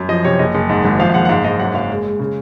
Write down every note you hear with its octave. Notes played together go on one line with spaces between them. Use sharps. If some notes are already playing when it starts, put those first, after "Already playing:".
Already playing: F#2
F3 D#5
C3 C#5
F#1 D#5
F#1
G#2
G#1
F3 F5
F5
F#1 F#5
F#5
G#2 F5
G#2 D#5
F#2 F#5
F#1 F5
G#3
G#3
C#3